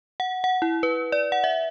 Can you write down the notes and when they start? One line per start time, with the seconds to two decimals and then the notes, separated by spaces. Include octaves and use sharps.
0.20 F#5
0.44 F#5
0.62 E4
0.83 B4
1.12 D5
1.32 F#5
1.44 E5